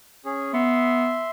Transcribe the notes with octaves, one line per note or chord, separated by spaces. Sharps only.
C#4 G#4
B3 E5 C6